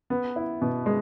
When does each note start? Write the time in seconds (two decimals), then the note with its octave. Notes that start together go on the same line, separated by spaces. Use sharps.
0.10 B3
0.36 E4
0.62 B2
0.86 G#3